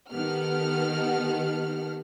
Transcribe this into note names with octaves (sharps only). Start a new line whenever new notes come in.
D#3 B3 G4 A4 F#5 F6